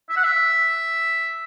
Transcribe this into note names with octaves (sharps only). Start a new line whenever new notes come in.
E5
F#5
E5